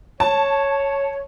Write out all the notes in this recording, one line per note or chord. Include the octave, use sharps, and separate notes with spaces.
C#5 A5